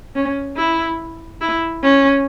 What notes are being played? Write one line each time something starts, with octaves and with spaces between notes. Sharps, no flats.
C#4
E4
E4
C#4